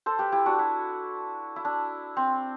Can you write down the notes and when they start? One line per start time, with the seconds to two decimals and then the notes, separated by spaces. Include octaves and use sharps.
0.06 A4 C5
0.19 G4 B4
0.32 E4 G4
0.46 D4 F#4
0.59 E4
1.56 E4
1.65 D4
2.17 C4